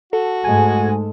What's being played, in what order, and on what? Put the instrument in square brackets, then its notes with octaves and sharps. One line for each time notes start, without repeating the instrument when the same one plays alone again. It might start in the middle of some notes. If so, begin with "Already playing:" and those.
[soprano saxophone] F#4 [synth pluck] A4
[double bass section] G#2 G#3 A3 [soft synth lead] G#5